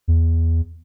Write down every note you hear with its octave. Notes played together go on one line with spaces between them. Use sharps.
E2